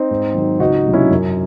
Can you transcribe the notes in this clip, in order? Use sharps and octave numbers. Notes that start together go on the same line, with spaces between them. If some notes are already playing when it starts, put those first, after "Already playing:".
Already playing: C4 D#4
G#2
D#3 F#3
C#2 D#4 F#4
C3 F#3
C#4 E4
F#2